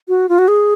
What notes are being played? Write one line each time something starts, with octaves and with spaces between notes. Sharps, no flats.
F#4
F4
F#4
G#4